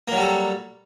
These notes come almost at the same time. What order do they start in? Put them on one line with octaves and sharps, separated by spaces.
A#3 F#3 G3 A4